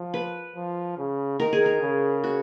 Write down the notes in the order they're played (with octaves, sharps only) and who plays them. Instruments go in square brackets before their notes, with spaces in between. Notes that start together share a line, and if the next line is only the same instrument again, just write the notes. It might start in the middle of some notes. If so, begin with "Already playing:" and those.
Already playing: [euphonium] F3
[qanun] B4
[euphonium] F3
C#3
[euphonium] D#3 [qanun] A#4
[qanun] G#4
A#4
[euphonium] C#3
[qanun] F#4